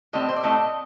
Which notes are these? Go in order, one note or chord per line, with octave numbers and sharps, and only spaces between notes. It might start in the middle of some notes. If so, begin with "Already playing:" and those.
A2 G3 C4 D#5
C5
D5
A2 A3 C4 D#5